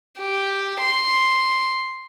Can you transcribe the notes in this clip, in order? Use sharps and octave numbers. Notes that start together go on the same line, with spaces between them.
G4
C6